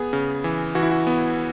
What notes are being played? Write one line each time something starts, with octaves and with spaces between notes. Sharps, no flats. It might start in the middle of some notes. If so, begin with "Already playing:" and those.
Already playing: B3 G#4
C#3
E3
E3 F#4
E4
F#4
B3